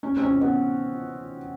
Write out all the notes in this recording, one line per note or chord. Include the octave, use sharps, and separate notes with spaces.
C#4
C4
C#4
B3